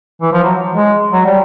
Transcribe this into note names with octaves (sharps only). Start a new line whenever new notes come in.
E3
F3
F#3
G#3
F#3
G3